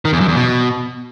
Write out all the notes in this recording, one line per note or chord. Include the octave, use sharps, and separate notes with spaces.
D#3
E2
F#2
E2
B2